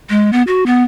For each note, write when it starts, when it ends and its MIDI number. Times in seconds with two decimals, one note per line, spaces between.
0.09 0.30 56
0.33 0.43 59
0.47 0.64 66
0.66 0.84 59